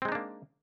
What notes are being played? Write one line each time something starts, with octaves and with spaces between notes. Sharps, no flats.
G#3 A#3 C4 D4 D#4